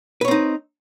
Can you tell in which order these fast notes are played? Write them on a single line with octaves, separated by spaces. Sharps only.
B4 C#5 C4 D#4